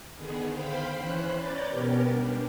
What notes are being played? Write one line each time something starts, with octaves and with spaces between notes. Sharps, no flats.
D3 D#3 B3 G#4
C5 F5 G5 B5
E3 C#4 C5 B5 F#6
B4 C#5 D5 A#5 G6 A6
B2 B3 C#4 G4 A#4
G3 D4